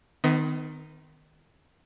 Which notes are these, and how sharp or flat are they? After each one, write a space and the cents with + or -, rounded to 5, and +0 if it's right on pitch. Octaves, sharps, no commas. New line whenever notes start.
D#3 -10 B3 +40 D#5 +45